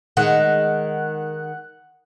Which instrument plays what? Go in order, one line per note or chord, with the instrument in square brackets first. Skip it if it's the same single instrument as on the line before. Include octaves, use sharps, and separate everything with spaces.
[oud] D#3 G#3 [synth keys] F#5 F#6